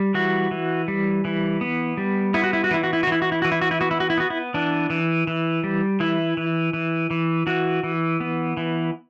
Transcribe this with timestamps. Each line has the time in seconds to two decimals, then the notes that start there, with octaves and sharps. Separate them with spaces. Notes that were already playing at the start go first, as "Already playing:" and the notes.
Already playing: G3
0.14 E3 F#4
0.51 E3
0.88 G3
1.25 E3
1.61 B3
1.97 G3
2.34 B3 E4
2.44 F#4
2.53 E4
2.64 F#4
2.71 E3 E4
2.84 F#4
2.93 E4
3.03 F#4
3.07 E3 E4
3.22 F#4
3.32 E4
3.42 E3 F#4
3.52 E4
3.61 F#4
3.71 E4
3.81 B3 F#4
3.91 E4
4.00 F#4
4.10 E4
4.18 B3 F#4
4.30 E4
4.54 E3 D4
4.90 E3
5.27 E3
5.64 G3
6.00 E3 E4
6.37 E3
6.73 E3
7.10 E3
7.47 E3 F#4
7.83 E3
8.20 B3
8.57 E3